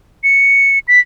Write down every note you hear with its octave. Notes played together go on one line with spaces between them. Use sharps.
C#7
B6